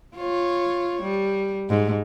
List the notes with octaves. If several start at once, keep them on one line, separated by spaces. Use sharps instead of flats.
F4 C#5
G3
G#2